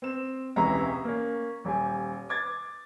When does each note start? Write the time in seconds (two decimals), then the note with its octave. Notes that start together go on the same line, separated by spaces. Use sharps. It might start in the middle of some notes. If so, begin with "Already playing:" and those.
0.02 C4 E7
0.56 E1 C#2 C3 E3 C#4 A#5
1.04 A#3 C#4
1.65 D#1 G4 G#5
2.29 D6 G#6 A6